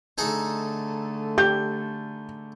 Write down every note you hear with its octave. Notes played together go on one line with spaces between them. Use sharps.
D3 A3 D#4 G#4 A4
G4 G6